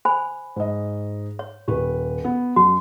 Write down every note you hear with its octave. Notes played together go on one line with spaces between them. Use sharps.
C5 G#5 B5
G#2 D#5
C#5
D#1 G4 B4
B3
F#2 F#4